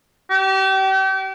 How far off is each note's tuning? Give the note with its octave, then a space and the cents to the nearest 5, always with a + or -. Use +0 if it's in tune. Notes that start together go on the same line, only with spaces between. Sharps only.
G4 -35